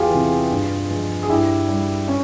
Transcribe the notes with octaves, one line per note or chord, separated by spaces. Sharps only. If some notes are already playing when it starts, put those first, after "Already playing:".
Already playing: E2 F4 G4 G#4
C3 E3
G2
F3 G#3
G#4
G2 E4 G4
G3
C#4